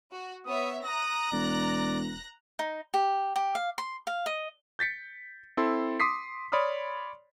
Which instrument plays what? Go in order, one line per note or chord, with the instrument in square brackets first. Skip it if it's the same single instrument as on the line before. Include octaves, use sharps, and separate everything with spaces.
[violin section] F#4
[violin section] B3 C#5 E5 [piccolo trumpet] D#6
[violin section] A#5 F#6 A#6 [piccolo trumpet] D#6
[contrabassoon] E1 [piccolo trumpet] D5
[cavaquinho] D#4
G4
G4
F5
C6
F5
D#5
[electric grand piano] G6 A6 B6 C#7
C4 E4 A4 C6
C6 D6 D#6 B6 C7
C#5 D5 B5 C6 D#6 F6